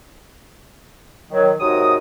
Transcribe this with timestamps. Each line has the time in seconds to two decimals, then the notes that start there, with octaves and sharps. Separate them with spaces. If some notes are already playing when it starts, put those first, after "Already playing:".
1.31 D#3 F#3
1.60 G#2 C3 F#3 A#4 D#6